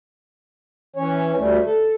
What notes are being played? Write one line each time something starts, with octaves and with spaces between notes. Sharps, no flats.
E3 C#4 C#5
D2 G3 A3
A4